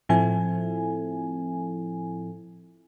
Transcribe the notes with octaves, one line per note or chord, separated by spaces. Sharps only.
A2 F3 C4 E4 A4 G#5